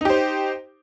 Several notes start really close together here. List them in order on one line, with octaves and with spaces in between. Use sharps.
D#4 G4 C5